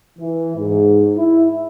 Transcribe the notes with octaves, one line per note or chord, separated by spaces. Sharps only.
E3
G#2
E4